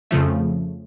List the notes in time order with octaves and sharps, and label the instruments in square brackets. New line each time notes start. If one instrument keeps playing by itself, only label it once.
[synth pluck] F2 C#3 F3 A3